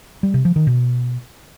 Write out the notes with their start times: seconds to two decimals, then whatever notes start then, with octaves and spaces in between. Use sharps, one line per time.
0.23 G3
0.34 C3
0.45 F3
0.56 D#3
0.67 B2